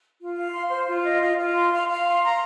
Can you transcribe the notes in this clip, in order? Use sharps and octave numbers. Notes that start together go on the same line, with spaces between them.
F4
F5
C6
C5
F4
D#5
F4
F4
C6
F5
F5
C6
A#5